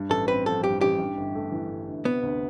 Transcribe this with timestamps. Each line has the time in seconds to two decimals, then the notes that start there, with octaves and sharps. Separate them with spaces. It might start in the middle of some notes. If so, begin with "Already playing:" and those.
Already playing: G2
0.10 A1 A4
0.28 C4 B4
0.46 F3 A4
0.64 G2 G4
0.81 A1 G4
0.99 G2
1.17 G1
1.35 A3
1.52 E3
1.70 G2
1.88 G1
2.05 C3 B3
2.23 D2